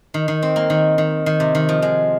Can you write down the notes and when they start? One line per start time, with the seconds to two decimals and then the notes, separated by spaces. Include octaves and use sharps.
0.14 D#3
0.28 D#3
0.43 C4
0.56 A#3
0.70 D#3
0.98 D#3
1.26 D#3
1.40 C3
1.55 D#3
1.69 F3
1.82 G#3